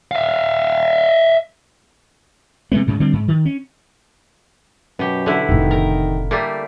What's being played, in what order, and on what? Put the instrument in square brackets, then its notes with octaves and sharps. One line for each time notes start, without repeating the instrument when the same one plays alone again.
[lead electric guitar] E5 F5
[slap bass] C3 G#3 A3 B3
D2 G#2 C#3
D3 G3 C4
G#2
D#3
C#4
[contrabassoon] F#2 [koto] B2 G4
[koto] D3 E4
[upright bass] F1 A2 [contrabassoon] D#3
[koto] A#4
G3 A3 A#3